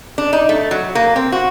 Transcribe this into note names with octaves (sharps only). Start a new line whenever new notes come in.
D4
D#4
A3
F#3
A#3
C4
F#4